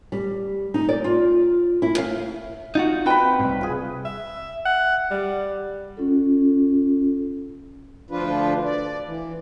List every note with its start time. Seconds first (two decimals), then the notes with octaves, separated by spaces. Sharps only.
0.12 G3
0.74 D#4
0.89 D5
1.04 F4
1.82 E4
1.98 F5
2.75 D#4 F4 F#4
3.06 C4 B4 G5 B5
3.40 C2 G#2
3.61 F4 G#4
4.05 E5
4.66 F#5
5.11 G3
5.97 C#4 F4 A4
8.11 D2 F3 D4 F4 B4
8.65 D5
9.06 E3